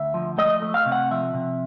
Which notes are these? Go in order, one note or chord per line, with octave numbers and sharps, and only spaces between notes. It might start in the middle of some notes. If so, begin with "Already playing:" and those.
Already playing: D2 E5
F3
A3 D#5
A3
F5
C3
F#5
F3 E5
C3